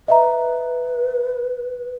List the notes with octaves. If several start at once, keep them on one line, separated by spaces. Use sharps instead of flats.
B4 D#5 E5 A#5